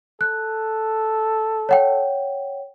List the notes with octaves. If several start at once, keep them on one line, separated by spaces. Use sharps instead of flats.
A4 F#6
C#5 F#5 G5